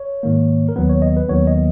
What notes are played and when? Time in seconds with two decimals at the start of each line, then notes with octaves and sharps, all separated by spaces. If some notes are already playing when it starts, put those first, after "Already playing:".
Already playing: C#5
0.23 G#2 D#3 A#3
0.69 A#4
0.76 D#2 D#3 F#3 B3 B4
0.89 C#5
1.02 D#5
1.17 B4
1.29 D#2 D#3 F#3 B3 C#5
1.47 D#5